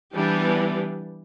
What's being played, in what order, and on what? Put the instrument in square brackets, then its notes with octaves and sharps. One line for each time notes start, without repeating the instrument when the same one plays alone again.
[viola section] E3 G3 B3 D4 G4